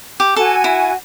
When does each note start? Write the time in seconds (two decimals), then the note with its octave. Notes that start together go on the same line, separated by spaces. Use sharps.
0.20 G4
0.36 F#4 A4 G#5
0.64 E4